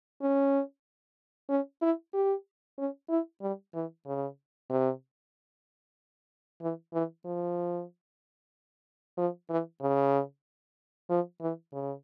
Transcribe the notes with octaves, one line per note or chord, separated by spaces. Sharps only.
C#4
C#4
E4
G4
C#4
E4
G3
E3
C#3
C3
E3
E3
F3
F3
E3
C#3
F3
E3
C#3